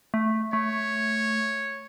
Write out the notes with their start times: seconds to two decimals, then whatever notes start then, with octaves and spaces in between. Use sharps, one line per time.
0.14 A3
0.53 A3 C#5